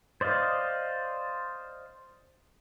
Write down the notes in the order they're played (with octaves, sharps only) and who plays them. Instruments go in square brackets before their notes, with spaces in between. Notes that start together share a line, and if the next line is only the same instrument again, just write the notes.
[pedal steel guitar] C5 D5 D#5 F5